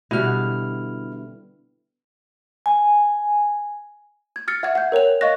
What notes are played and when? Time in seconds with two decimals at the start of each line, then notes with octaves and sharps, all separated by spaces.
0.11 B2 D3 G3 E4 F6
2.66 G#5
4.36 G#6
4.48 E6 F6 A6 C#7
4.63 E5 F#5 G#6
4.75 F#5 G6
4.92 A#4 C#5 G5 F7
5.21 D#5 F5 C#6 F#6 A#6